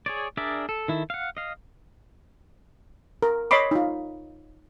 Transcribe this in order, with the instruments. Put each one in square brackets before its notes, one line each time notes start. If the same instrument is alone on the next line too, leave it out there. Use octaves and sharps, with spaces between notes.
[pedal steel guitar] G#4 C#5 D5
D4 G#4 A#4 D5 E5
A4
D#3 E4 A4
F5 F#5
D#5 F5
[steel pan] A#4
C#5 D#5 B5 C6 D6
D#4 F4